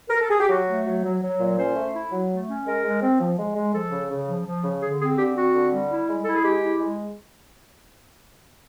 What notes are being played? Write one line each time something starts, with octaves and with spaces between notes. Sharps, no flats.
A#4
A4
G#4
G4
F#3 F#4
A3
F#3
F#3
F#3
A#2
C#4 C5
A3
E4
F#3
A3
C#4
G#3 A#4
G#3
C4
F3
G#3
G#3
F3 A4
C#3
C#3
F3
F3
C#3
D3 G#4
C4 G#4
D3 G4
C4 F#4
D3
G3
E4
G#3
E4 A4
G#4
G#3 G4
E4
G#3